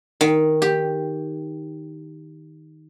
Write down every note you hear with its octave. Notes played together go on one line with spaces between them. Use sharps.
D#3
G4